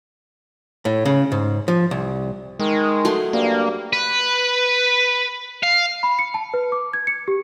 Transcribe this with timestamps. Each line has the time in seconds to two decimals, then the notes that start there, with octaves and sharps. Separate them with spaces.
0.85 A2
1.06 C#3
1.32 G#2
1.68 F3
1.91 C2
2.60 D#3 G#3
3.05 F#3 A3 C6
3.33 G2 A#3
3.93 B4
5.63 F5
6.03 B5
6.19 C#7
6.34 A5
6.54 B4
6.72 D6
6.93 G#6
7.07 C#7
7.28 G4